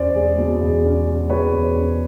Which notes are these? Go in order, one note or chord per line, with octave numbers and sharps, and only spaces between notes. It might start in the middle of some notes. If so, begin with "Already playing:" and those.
Already playing: E2 B2 C#4 C5 D5
G#3
B2
E2
C#4
G#3
B2 B4 C#5
E2
C#4